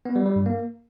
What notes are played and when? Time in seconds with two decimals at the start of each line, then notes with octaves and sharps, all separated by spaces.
0.05 B3
0.16 G3
0.26 G3
0.36 G2
0.46 A#3